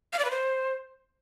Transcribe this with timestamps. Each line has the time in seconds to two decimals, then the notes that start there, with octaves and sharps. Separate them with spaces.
0.13 F5
0.19 D5
0.25 B4
0.31 C5